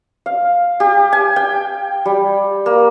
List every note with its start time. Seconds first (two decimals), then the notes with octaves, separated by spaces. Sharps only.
0.26 F5
0.80 G4
1.13 G#5
1.36 G5
2.05 G3
2.66 A#3